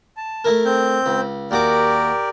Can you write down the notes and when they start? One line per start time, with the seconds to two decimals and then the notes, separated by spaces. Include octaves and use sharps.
0.17 A5
0.45 A3 E4 A#4
0.65 C4 G6
1.06 C#2
1.51 D#2 F#4 G4 A#4 D5 D6